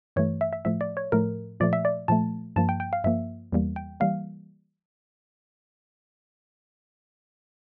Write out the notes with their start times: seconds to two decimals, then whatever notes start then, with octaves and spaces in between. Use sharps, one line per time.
0.16 G2 E3 A3 C#5
0.41 E5
0.53 E5
0.65 A2 F3 A3 E5
0.81 D5
0.97 C#5
1.12 A2 F3 A3 A#4
1.60 A#2 F3 A3 D5
1.73 E5
1.85 D5
2.08 A#2 F3 A3 A5
2.56 G2 F3 A#3 A5
2.69 G5
2.80 G5
2.93 F5
3.04 G2 F3 A#3 E5
3.52 E2 E3 G3 A#3
3.76 G5
4.00 E3 G3 A#3 F5